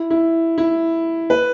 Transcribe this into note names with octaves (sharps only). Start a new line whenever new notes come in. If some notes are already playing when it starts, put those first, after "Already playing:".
Already playing: E4
E4
E4
B4